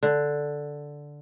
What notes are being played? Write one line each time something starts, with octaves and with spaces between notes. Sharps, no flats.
D3